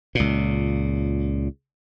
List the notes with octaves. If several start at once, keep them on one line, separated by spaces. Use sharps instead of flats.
C#2 A#2